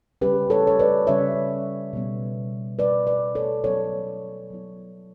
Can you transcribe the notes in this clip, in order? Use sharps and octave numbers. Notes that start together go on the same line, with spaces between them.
C#3 G3 C#4 G4 B4
A4 C#5
C#5
B4 D5
C#3 G3 C#4 C#5 E5
B2 G3 B3
B2 G3 B3 B4 D5
B4 D5
A4 C#5
F#3 B3 E4 A4 C#5
F#3 B3 E4